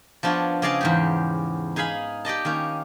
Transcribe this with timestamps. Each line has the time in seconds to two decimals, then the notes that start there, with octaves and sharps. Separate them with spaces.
0.23 F3 B3 D4 F4 C#5
0.62 C#3 G#4 D5 D#5 F5 A5
0.81 E2 G#2 G4
1.76 D#4 G#4 F5 G#5 B5
2.25 G4 D5 D#5 A5
2.45 D#3 A#3 C#4